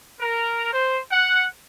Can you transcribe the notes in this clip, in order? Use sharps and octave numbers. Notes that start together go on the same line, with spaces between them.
A#4
C5
F#5